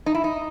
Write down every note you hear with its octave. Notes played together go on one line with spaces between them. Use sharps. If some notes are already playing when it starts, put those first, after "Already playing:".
D#4
E4
D#4